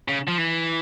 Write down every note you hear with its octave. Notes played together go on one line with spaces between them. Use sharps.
C#3
F3
E3